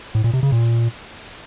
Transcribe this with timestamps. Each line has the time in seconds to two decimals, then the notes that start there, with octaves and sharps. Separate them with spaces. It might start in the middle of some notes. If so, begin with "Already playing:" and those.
0.15 A2
0.24 A#2
0.34 C3
0.43 C#3
0.52 A#2